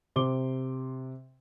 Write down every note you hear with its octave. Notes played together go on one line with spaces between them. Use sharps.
C3 C5 C6 D6 G7